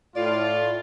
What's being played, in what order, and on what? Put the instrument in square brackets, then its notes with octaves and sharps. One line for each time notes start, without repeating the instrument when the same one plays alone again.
[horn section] A2 F4 [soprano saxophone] D5